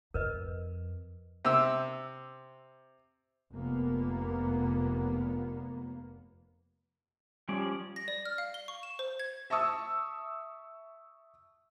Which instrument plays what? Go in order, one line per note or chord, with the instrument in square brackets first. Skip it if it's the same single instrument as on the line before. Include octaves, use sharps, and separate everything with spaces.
[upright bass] F2 [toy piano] A#4 B4 D#5
[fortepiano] C3 E6
[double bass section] F1 A#3 B3
[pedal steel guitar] F3 C#4 D5 [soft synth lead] G3
[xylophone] A#6
D5
F6
F5
G7
C#6
E7
C5
G#6
[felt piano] E5 A5 C#6 D#6 E6